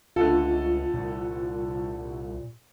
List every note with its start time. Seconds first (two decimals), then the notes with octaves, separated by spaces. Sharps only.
0.16 C#2 D3 A3 F4 A4
0.94 C2 A#2